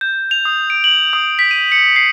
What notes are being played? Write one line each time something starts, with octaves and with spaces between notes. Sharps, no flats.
G6
F7
D#6
D7
F#7
D#6
B6
D#7
C#7
C7